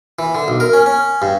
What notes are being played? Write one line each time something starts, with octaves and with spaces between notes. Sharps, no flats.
E3
D3
B1
A#4
C#4
C#4
G2